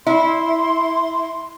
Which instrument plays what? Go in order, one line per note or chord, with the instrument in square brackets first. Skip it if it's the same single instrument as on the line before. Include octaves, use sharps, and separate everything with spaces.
[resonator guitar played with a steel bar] E4 [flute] C6